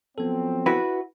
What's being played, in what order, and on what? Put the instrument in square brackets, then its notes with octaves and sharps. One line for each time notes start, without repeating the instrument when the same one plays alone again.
[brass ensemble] F3 F#3 C4 [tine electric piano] B3 A4
[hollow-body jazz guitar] E4 F#4 B4